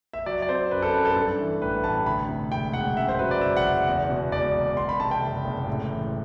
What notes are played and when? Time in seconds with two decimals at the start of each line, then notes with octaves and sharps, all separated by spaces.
0.13 E5
0.26 F#3 D5
0.42 D5
0.49 C4 C5
0.71 F#2 B4
0.82 A4
0.93 F#2 B4
1.05 A4
1.16 G2 A4
1.39 E3
1.61 A1 B4
1.84 A1 A5
2.06 D2 B5
2.29 C3
2.52 E1 G5
2.73 E1 F#5
2.97 F#2 E5
3.09 C5
3.19 F#3 B4
3.31 D5
3.41 F#1 E5
3.57 F#5
3.64 F#1
3.87 E2
4.10 B2
4.32 E1 D5
4.55 E1
4.77 E2 C6
4.89 B5
5.00 C3 A5
5.11 G5
5.22 F#1
5.45 F#1
5.67 A2
5.90 E3